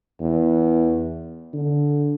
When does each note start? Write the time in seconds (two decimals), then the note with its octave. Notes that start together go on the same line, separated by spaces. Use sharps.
0.20 E2
1.54 D3